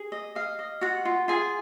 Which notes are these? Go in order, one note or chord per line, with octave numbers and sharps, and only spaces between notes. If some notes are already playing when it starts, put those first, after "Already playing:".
Already playing: G#4
D#5
D#5 F5
D#5
F4 F#4 F#5
F4
F4 G#4 G#5